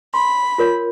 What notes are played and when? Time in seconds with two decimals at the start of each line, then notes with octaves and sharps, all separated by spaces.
0.14 B5 C6
0.58 F4 A#4 C#5